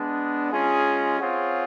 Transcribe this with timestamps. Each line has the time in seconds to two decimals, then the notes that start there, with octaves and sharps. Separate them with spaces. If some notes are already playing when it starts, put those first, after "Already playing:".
Already playing: G#3 B3 D4
0.52 G#3 C#4 F4 G#4
1.20 C4 F4 G#4 C#5 F#5